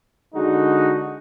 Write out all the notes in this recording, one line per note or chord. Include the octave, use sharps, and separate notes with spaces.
D3 G#3 D#4 F#4